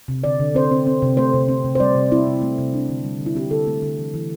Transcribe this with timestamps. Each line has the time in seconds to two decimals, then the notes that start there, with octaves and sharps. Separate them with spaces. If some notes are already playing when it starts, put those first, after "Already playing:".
0.08 C3
0.24 D3 D5
0.40 D3
0.55 C4 C5
0.71 C4
0.86 C4
1.02 C3
1.17 A3 C5
1.33 C3
1.48 C4
1.64 C3
1.75 C5
1.80 G3 D5
1.95 C3
2.12 C4 E4
2.27 C3
2.42 A3
2.58 C3
2.74 D4
2.89 D3
3.04 G3
3.20 D3
3.26 E4
3.35 C4 G4
3.51 D3 A4
3.67 A3
3.82 D3
3.98 E3
4.14 E3